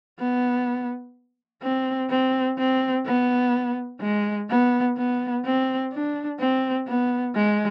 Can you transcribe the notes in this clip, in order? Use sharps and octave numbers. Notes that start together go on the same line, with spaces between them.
B3
C4
C4
C4
B3
G#3
B3
B3
C4
D4
C4
B3
G#3